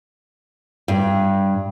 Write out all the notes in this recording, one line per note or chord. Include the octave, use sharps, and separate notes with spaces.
G2